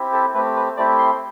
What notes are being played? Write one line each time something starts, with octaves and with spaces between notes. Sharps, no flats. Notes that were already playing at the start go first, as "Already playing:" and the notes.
Already playing: C4 E4 G4
A4
A3 C4 G4 B4
B4
A3 C4 E4 G4 D5
C6